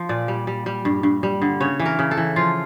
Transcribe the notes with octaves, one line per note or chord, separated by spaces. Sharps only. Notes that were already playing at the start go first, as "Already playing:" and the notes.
Already playing: F3
A#2 D5
G3
G3
G3
G2
G2
G3
D3
C#3 C#5
E3
A#4
C#3
A4
E3
F3 F4